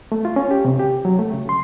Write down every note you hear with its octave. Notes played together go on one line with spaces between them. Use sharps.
A3
F4
C#4
G4
C3
G4
F#3
A3
C#3
C6